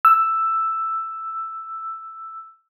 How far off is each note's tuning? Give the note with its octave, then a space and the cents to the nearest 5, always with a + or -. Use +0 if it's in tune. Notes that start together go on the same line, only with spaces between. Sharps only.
E6 +5